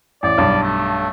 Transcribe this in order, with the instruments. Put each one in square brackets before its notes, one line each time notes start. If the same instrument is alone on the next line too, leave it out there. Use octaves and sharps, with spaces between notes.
[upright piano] A1 [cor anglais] D5
[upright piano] B1 G2
[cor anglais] A3